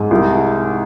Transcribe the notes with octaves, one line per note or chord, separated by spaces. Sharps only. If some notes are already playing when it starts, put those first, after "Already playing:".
Already playing: G#2
C2